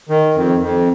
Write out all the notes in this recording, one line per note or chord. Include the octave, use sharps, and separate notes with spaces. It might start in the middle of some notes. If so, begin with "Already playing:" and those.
D#3
F2
F2